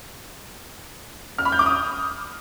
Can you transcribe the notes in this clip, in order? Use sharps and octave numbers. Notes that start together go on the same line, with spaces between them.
F6
B5
G6
D6
D#6